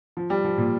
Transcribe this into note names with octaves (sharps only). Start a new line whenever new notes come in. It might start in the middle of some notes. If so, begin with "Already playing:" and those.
F3
G3
F3
A#2